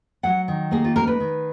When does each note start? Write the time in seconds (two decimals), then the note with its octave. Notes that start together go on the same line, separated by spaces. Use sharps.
0.23 F#3 F#5
0.48 D#3
0.71 A#3 G#4
0.84 F4
0.96 D#4 A#4
1.07 B4
1.20 D#3